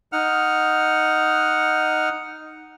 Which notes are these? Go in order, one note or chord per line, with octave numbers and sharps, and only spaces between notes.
D#4 F#5 F6